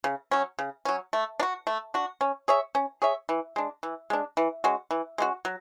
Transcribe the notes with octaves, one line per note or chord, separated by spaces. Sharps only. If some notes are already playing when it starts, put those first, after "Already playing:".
C#3
F#3 C#4
C#3
F#3 C#4
A3
D4
F#4
A3
D4 F#4
C#4
G#4 C#5 E5
C#4
G#4 C#5 E5
E3
G#3 D4
E3
G#3 D4
E3
G#3 C#4 F#4
E3
G#3 C#4 F#4
F#3